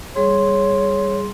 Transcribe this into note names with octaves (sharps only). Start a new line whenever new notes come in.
G3 G#4 C#5 C6